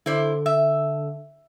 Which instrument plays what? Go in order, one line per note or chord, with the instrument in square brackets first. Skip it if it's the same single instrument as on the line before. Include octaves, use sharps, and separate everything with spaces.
[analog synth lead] D3 [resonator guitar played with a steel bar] E4 C5 D5
[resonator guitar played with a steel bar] E5